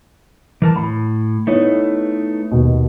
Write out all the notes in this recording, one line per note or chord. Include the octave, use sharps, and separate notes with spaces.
E3 A#4 A5
A2 B5
A3 B3 D#4 E4 B4 C#5
D#2 B2